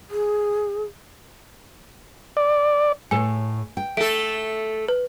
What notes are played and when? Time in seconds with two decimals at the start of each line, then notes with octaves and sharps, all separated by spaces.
0.10 G#4
2.37 D5
3.11 A2 A4 C#5 G#5
3.77 G5
3.97 A3 A4 D7
4.88 B4